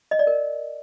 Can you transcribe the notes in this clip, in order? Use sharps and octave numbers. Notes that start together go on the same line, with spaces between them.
D#5
D5
A#4